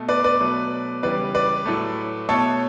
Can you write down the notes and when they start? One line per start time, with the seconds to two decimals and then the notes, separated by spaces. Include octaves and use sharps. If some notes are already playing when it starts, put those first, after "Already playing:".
Already playing: B2 A3
0.09 B4 D5
0.24 B4 D5
0.40 B2 F#3 A3
1.03 C#3 E3 G3 B4 D5
1.35 B4 D5
1.66 A2 F#3 A3
2.29 B2 A3 A4 C#5